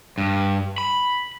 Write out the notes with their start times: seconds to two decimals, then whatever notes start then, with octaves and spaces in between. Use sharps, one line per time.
0.18 G2
0.78 B5